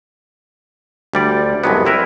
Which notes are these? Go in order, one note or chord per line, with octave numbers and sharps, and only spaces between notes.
D2 G3 D5
C2 F2 C3 F#3 G#3 B3
C4 E4 A#4 B4